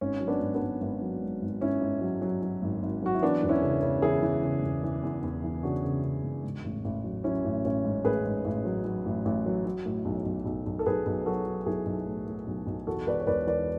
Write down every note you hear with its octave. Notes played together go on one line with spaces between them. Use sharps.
G#1 C#4
F#3
B3 D4
G#1
B3 D4
G#1
G#1
F#3
G#2
G#1
G#1 C#4 E4
G#2
F#3
F#3
F#3
G#1
G#1
F#3 F#4
E4
E3 B3 D4
E1
C#4 E4
C#3
C#3
E3 E4 G#4
E3
C#3
E1
E3
E2
E2
E3
C#3 D4 F#4
C#3
C#3
E1
G#2
A1
A1
F#3
F#3 C#4 E4
A1
A1 C#4
G#2
A1 G#4 B4
G#2
A1
F#3
F#3
A1
A1
F#3
F#3
A2
B1
B1
B1
B1
A4
B1 G#4 B4
B1
F#3 F#4 A4
F#3
B1 E4 G#4
B1
A2
A2
B1
B1
E2 F#4 A4
E1 B4 D5
C#5
E1 B4 D5
E3 B4 D5